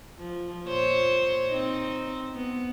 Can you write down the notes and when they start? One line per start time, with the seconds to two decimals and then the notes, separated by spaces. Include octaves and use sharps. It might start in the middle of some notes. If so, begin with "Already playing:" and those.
0.18 F3
0.67 A#2 C5 C#5
1.49 C4 D#4
2.34 B3